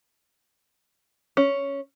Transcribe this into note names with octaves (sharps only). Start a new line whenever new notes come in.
C#4